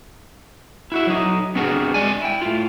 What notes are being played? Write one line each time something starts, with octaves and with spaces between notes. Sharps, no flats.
E4 F#4 E5
F#3 D#4
B3 C4 D4 F#4 G#4 A#4
G#3 D5 G#5
E4 G5
A2 F4